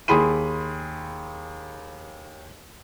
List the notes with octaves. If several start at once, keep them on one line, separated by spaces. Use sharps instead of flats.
D#2 G#4 B5 C6 D#7